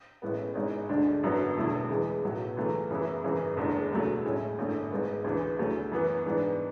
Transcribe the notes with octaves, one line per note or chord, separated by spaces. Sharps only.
A1 A2 G#3 B3
G#1 G#2 G#3 C#4
D2 D3 G#3 D4
G#1 F#2 D3 F#3 B3
E1 E2 D3 A3 E4
E2 C#3 E3 G#3
B1 A2 F#3 B3
C#2 C#3 E3 A3
F#2 C#3 E3 B3 E4
G#1 F#2 C#3 E3
F#1 E2 D3 G#3
E1 D2 C#3 F#3 A3
A2 G#3 C#4 E4
G#1 F#2 D3 A3 C#4
G#1 G#2 G#3 B3
D2 C#3 E3
D2 C#3 F#3 A3 C#4
F#2 E3 B3
G#2 E3 B3 D4